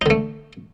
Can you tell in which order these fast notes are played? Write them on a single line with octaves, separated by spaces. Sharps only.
D#4 D3 A3